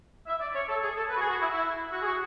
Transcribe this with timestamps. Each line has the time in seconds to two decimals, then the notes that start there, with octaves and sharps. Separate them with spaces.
0.26 E5
0.40 D5
0.53 C#5
0.68 A4
0.81 G#4
0.95 A4
1.09 B4
1.15 F#4
1.19 G#4
1.29 F#4
1.40 E4
1.51 E4
1.92 F#4
2.01 G#4
2.06 F#4